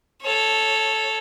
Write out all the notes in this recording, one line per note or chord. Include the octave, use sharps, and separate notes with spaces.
A4 C#5